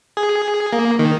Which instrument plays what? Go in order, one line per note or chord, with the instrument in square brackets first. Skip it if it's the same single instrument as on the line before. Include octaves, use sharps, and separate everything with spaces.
[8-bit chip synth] G#4
A#3
D#3